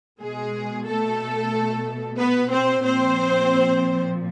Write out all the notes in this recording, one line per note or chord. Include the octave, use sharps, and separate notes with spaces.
B2 G#3 G#4
A3 A4
B3 B4
C4 C5
A#2 F3 C4 C5